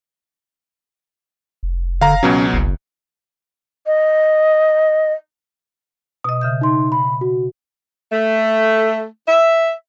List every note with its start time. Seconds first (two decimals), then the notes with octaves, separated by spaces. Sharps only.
1.63 F1
2.01 D3 F5 A#5
2.23 C#2 B2 F#3 C#4
2.54 F#1 C2
3.87 D#5
6.24 B2 D#5 D#6
6.41 C#3 E5 G6
6.61 D#4 C6
6.92 B5
7.21 F#4
8.12 A3
9.27 E5